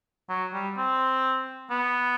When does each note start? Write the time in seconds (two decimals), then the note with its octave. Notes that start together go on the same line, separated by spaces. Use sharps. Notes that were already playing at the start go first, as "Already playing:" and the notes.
0.29 F#3
0.53 G3
0.77 C4
1.71 B3